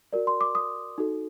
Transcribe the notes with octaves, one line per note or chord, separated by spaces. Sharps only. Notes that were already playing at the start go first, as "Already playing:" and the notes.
F#4 A#4 D5
C6
D6
D#6
D#4 F#4 A4